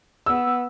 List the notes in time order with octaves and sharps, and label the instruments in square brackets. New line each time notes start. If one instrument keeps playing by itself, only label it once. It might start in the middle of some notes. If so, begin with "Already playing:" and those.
[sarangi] B3 [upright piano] E6